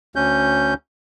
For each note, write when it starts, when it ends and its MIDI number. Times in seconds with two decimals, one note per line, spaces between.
0.16 0.74 38
0.16 0.74 61
0.16 0.74 91